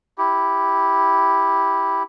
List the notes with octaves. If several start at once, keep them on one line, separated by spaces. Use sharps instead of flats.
E4 G4